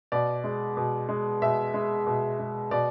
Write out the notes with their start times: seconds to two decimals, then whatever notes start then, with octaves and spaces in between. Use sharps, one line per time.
0.12 B2 D5
0.44 G#3
0.77 B2
1.09 G#3
1.42 B2 E5
1.74 G#3
2.07 B2
2.39 G#3
2.71 B2 D5